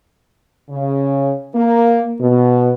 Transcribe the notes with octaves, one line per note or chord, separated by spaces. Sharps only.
C#3
A#3
B2